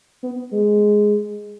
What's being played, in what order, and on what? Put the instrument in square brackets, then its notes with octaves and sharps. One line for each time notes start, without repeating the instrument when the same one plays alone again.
[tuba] B3
G#3